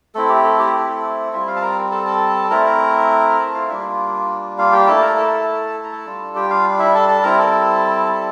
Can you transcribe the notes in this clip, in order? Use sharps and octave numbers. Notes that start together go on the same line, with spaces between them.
A3 C4 E4 A4
G4
A4
G4
G4
A4
G3 C4 E4 F4 E5
F4 F5
A5
A#4 A#5
A4 A5
A4 A5
A3 C4 E4 A#4 A#5
A#4 A#5
A4 A5
F4 F5
G3 A#3 D4 E4 F4 E5
F4 F5
G4 G5
A3 E4 A4 A5
A#4 A#5
A4 A5
A4 A5
A5
A#5
A4 A5
G3 D4 F4
G4 G5
F4 F5
E4 E5
A4 A5
A4 A5
G3 C4 E4 A#4 A#5
A4 A5
A4 A5